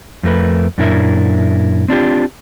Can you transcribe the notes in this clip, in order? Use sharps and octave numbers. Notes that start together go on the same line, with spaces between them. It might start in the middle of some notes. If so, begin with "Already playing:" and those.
F2 A3 A#4 B4
F#2 A#2 D4 E4 A#4 E5
C4 D4 F4 G4